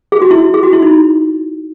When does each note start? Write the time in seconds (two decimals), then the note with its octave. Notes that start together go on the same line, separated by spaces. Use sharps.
0.12 G#4
0.22 F#4
0.31 E4
0.54 G#4
0.63 F#4
0.73 E4
0.82 D#4